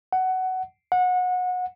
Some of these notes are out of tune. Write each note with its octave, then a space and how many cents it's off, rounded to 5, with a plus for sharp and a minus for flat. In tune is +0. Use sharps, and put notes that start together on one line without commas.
F#5 +15
F#5 -25